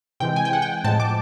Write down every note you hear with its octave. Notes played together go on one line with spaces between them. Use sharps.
C3 E3 G#3 G5
G#5
G5
F#5
G5
A2 F3 G#3 A5
D6